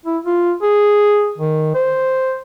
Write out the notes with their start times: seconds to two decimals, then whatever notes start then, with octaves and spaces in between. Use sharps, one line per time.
0.06 E4
0.25 F4
0.62 G#4
1.38 D#3
1.74 C5